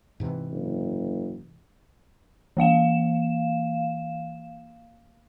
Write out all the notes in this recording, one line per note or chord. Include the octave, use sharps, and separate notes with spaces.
G#2 C3 E3
F#1
E3 A#3 F5 E7